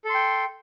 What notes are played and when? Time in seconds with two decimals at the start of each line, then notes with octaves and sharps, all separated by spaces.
0.05 A4
0.10 C6
0.14 G5